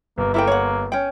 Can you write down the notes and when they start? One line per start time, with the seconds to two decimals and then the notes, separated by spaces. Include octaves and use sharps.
0.18 G1 A#3
0.34 A#3 E4 A4 G5
0.47 C#5 F#5
0.92 C#4 G5